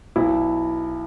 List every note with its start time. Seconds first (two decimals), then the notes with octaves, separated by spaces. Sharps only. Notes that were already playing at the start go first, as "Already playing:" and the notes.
0.16 B1 E4